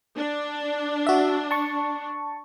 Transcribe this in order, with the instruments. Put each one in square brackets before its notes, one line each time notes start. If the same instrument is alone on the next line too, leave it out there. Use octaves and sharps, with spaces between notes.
[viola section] D4
[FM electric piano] F#4 E5
A5 C#6